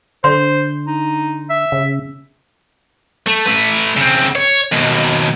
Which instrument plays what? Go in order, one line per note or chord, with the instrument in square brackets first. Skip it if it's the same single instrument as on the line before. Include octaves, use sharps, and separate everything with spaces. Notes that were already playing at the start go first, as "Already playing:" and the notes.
[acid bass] D3 [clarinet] C5 [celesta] C6
[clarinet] D#4
E5
[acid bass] C#3
[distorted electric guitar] A3
A3 B4
C#3 C4
C#5
D#2 B2